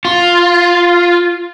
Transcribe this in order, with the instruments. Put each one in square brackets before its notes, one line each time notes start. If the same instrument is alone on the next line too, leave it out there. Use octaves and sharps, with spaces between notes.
[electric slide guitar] F4